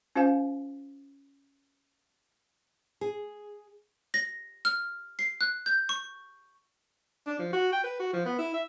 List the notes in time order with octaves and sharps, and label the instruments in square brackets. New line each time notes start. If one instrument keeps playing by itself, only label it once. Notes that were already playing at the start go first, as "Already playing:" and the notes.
[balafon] C#4 F4 C5 F5 G#5
[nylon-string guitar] G#4
[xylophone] A#6
F6
C7
F#6
G6
C#6
[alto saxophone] D4
F3
F#4
G5
B4
F#4
F3
B3
E4
E5